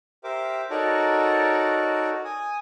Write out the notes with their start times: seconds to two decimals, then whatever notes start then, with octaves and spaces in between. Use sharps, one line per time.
0.24 G4 A#4 C5 E5 D6
0.70 D#4 F#4 A4 A#4 C#5 D5
2.25 G#5 D#6